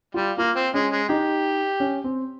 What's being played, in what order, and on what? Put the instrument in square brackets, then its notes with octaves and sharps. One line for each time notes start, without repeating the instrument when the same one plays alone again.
[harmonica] G3 [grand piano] F4
[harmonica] A#3 [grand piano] F4
[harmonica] C4
[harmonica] G#3 [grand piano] C#4
[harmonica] G#3
[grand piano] D#4 [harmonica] G4
[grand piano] C#4
C4